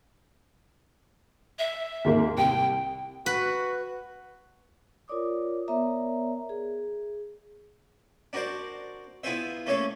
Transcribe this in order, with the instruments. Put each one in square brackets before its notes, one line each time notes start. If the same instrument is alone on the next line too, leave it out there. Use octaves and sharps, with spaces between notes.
[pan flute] E5
[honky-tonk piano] D#2 G#2 A#3
[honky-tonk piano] C2 [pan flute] G5
[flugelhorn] F#4 [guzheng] B4
[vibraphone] F4 A#4 C#5 D5 D6 D#6
B3 A#4 C#5 D5 E5 A#5
G#4
[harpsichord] D4 F#4 A#4 C5 D5
B3 E4 F4 G#4 C5 E5
A3 A#3 C#4 A4 C#5 F5